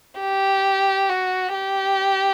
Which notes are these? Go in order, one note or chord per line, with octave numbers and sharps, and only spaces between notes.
G4
F#4
G4